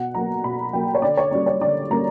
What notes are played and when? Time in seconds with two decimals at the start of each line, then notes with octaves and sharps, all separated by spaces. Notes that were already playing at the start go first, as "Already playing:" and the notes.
Already playing: B2 F#5
0.14 F#3 A#3 A#5
0.44 B2 B5
0.73 F#3 A#3 G5
0.95 C#5
1.02 D3 D5
1.17 C#5
1.31 G3 A#3 C#4 D5
1.46 C#5
1.61 D3 D5
1.90 G3 A#3 C#4 A#5